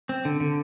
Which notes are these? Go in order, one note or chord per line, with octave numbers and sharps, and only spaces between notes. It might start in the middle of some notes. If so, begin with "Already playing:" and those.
C4
D3
D3